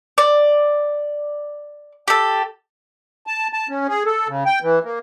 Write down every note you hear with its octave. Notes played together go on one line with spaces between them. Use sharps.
D5
G4 A4
A5
A5
C#4
G#4
A4
C#3
G5
E3
A#3